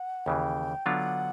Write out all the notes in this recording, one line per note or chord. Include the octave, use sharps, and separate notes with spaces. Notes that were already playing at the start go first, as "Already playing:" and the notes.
Already playing: F#5
D#2 C#3 E3 G5
D3 F#3 B3 D4 F4 F#5